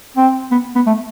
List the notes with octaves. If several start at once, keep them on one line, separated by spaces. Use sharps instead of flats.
C4
B3
B3
A3